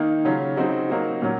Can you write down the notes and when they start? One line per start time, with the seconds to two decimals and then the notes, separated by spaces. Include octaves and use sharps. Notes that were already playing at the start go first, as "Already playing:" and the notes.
Already playing: D#3 A#3 D#4
0.25 C#3 F#3 C#4 F4
0.57 C#3 F#3 C4 D#4 F#4
0.89 F#3 A#3 D#4 F#4
1.22 A#2 F#3 C#4